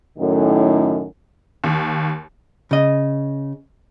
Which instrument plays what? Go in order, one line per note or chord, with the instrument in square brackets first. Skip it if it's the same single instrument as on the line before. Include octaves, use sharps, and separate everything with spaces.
[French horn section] F#2 A2 D#3
[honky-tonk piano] D#2
[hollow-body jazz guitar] C#3 D#5